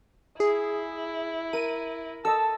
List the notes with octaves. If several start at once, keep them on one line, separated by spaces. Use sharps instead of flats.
E4 G#4
A#4 D#7
A4 D#5 A5 E6